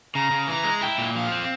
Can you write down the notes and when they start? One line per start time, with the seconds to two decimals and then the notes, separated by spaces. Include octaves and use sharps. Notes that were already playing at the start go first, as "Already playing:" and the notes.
0.14 C#3 A#5
0.31 C#3
0.48 E3 A#5
0.64 G#3
0.81 E4 G5
0.98 A#2
1.15 F3 F5
1.32 C4